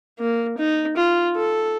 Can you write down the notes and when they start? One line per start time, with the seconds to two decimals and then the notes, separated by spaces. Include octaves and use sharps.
0.19 A#3
0.58 D#4
0.97 F4
1.36 A4